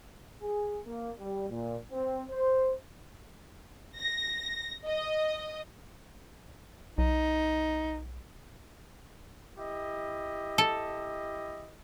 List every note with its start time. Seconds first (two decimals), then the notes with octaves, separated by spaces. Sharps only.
0.42 G#4
0.86 A#3
1.19 G3
1.50 A#2
1.92 C4
2.30 C5
3.99 A#6
4.87 D#5
6.98 B1 D#4
9.58 E4 G4 D#5
10.58 A4